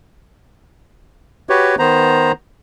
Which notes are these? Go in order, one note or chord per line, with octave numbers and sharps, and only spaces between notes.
F#4 G4 B4 C#5
D#3 B3 C5 A#5